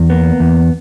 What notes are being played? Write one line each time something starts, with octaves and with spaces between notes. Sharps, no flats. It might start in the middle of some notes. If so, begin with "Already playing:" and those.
Already playing: E2
A#3 B3
E2